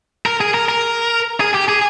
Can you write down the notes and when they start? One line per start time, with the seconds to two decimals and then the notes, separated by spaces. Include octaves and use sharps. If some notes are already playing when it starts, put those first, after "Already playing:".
0.26 A#4
0.41 G#4
0.54 A#4
0.69 A#4
1.40 G#4
1.54 G4
1.68 G#4